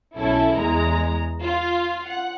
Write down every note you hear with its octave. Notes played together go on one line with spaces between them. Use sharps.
B1 C#4 E4 A4
E2 G#3 A#5
F4
F#5